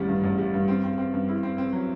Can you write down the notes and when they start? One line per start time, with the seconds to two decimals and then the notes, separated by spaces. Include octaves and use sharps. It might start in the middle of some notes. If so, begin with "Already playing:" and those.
Already playing: A1 D#3 G3
0.09 G2
0.24 A1
0.38 G3
0.54 G2
0.68 C4
0.84 C4
0.98 C4
1.14 G2
1.28 E4
1.43 C4
1.58 C4
1.73 F#3